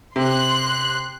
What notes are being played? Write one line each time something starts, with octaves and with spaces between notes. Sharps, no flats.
C3 C6 F#6